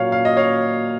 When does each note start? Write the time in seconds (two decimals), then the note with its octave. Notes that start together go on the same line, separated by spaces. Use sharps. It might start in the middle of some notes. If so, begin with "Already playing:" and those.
Already playing: A#2 F#3 A#3 C#5 F5
0.12 F5
0.25 D#5
0.37 C#5 F5